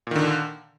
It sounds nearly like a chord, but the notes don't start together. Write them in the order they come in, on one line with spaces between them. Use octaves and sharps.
A#2 D#3 D3